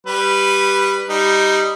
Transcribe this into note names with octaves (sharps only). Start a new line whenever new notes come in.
G3 B4
G3 D#4